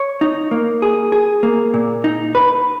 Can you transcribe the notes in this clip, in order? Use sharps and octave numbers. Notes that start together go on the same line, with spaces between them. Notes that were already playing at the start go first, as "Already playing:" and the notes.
Already playing: C#5
D#4
A#3
G#4
G#4
A#3
A#2
D#4
B4